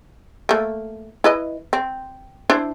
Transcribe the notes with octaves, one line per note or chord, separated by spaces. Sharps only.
A3 A#3
E4 B4 D#5
C4
D4 E4 C5